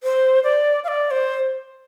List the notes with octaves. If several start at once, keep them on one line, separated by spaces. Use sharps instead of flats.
C5
D5
F5
D5
C5